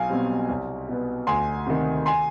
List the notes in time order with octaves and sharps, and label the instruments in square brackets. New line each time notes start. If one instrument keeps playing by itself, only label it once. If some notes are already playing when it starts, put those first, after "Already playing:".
Already playing: [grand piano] B1 F5 G#5
B2 G3 C4
C2
B2 B3
D2 G#5 C6
C3 D#3
G#5 C6